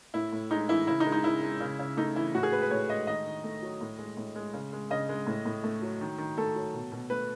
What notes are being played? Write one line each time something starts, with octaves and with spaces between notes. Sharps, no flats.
A2 E4
A2
G#3 D#4
E3 E4
C#3 E4
D#4
G#3
D#4
C#3 E4
G#3
C#3
C#3
A3 D#4
E3 E4
A2 F#4
G#4
G#3 B4
B4
A2 C#5
G#3 D#5
D#3 D#5
D#3
A3
F#3
A2
G#3
A2
G#3
C#3
G#3
C#3 D#5
G#3
A2
A2
A3
F#3
D#3
D#3
A3 A4
F#3
B2
B2
A3 B4